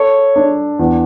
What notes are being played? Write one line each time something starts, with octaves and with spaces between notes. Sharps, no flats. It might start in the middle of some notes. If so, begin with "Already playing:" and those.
Already playing: A4 C#5
D4
E2